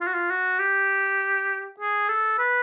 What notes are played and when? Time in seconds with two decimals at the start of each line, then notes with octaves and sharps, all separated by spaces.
0.01 F4
0.07 F#4
0.14 F4
0.30 F#4
0.59 G4
1.80 G#4
2.09 A4
2.39 B4